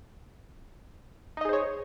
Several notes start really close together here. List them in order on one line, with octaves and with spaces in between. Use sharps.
D#4 D#5 G#4 C5 C#5